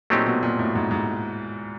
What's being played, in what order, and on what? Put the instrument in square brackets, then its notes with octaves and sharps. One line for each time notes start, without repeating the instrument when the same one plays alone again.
[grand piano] A#2 [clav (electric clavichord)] F#3 A3 C4 D#4 G4
[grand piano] B2
A#2
A2
G#2
G#2